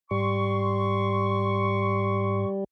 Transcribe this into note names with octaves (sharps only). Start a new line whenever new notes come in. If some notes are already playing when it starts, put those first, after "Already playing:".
G#2 G3 C6 C#6